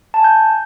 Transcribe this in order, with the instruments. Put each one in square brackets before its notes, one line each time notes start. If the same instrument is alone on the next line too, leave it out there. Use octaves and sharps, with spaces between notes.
[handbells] A5
G#5
G6